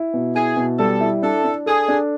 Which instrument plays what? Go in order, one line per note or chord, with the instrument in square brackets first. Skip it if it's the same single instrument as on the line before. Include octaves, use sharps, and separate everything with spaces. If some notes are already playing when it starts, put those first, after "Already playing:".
Already playing: [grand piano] E4
B2
[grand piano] E4 [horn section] G#4
[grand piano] B2
[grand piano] G3 [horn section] A4
[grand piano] E4
[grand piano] D4 [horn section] A4
[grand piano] D4
[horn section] G#4 [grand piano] A4
[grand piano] D4